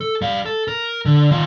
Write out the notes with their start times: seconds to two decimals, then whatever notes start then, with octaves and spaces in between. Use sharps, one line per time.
0.01 A4
0.22 G3 F5
0.46 A4
0.68 A#4
1.05 D3
1.31 D#3 F4